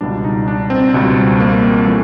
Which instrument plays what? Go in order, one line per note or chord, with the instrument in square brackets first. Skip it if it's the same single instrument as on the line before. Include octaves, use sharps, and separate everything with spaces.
[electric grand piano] C#2 B2 G3 D4
D#4
D4
C4
C#2 B2 G3
A#3
E3 G3 A3